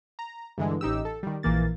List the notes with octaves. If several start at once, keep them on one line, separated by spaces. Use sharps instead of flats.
A#5
G2 D3 E3 G#3
A1 D#4 G4 E6
A4
D#3 G3
A#1 E3 A#3 A6